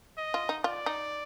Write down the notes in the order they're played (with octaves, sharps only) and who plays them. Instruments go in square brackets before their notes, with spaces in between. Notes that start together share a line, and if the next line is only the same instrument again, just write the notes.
[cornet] D#5
[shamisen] F4
D#4
[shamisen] F4 [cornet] D5
[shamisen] D#4